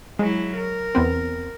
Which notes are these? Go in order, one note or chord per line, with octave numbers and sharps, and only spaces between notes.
F#3 G#3 E4
A#4
E2 B3 C4